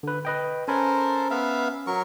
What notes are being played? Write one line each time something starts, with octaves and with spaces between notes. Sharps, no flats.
D3 B4
B4 D#5 G5
C#4 A4 A#4 C5 G#5 B5
B3 E5 F5
F#3 A#4 C#6